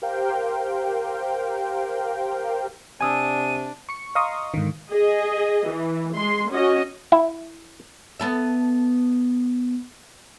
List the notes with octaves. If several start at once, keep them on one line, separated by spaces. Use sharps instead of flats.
G4 A#4 C5 F5 G5
C3 D4 G#5 D#6 E6 D#7
C#6 C#7
D#5 F5 A#5 C6 C#6 D#6
G#2 D3 D#3
G#4 D#5
E3
G#3 C6
C#4 F#4 D#5
E4
B3 A4 E5